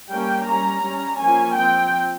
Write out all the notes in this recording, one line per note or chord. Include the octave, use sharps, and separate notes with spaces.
G3 A#3 C#4 G5
G3 C#4 A#5
G3 C#4
F3 A#3 C#4 G#5
F3 C4 G5